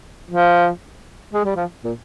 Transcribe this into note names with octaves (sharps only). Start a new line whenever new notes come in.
F3
G#3
G3
F3
A#2